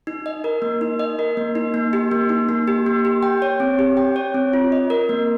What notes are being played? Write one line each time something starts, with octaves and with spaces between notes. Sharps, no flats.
D#4
D#5
A#4
A#3
D#4
D#5
A#4
A#3
D#4
A#3
G4
A#3
D#4
A#3
G4
A#3
G4
G5
C#5
C4
G4
G5
C#5
C4
F4
D#5
A#4
A#3